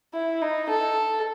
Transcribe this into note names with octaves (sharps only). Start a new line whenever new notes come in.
E4
D#4
A4